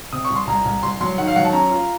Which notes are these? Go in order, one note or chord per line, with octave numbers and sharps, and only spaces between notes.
C3 D#6
C#6
C2
C6
C2 A#5
C2
C2 C6
F#3 C6
D#3 F#5
F5
F#3 F#5
A5
C#4 A#5
F4